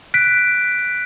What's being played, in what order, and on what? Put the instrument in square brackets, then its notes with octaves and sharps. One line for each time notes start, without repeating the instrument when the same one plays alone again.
[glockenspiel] F#6 B6 D7